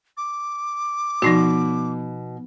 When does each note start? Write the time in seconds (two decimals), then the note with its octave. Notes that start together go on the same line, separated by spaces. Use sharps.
0.17 D6
1.22 B2 F3 D#4 F#4